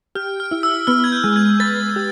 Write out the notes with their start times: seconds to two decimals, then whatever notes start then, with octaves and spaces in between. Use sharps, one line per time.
0.15 G4 F6
0.40 F6
0.51 E4
0.63 E6
0.87 B3 F6
1.04 G#6
1.12 G6
1.24 G#3
1.36 G#6
1.60 B4 A6
1.96 G4